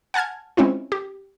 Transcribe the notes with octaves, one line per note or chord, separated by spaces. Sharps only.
F#5 G#5 A5 F6 G#6
G#3 C4 C#4 E4 F4
G4